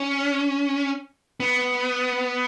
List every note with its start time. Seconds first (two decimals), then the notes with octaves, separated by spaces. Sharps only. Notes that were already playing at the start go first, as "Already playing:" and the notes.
Already playing: C#4
1.40 B3